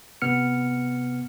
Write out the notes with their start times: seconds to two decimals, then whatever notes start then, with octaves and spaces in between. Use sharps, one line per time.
0.22 C3 B3 F6 C#7